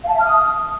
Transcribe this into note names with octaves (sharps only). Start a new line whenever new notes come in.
F5
A5
E5
F6
D#6